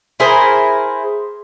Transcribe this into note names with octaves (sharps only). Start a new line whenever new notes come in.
E4 G#4 A#4 C5